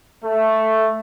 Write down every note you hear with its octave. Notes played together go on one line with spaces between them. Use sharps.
A3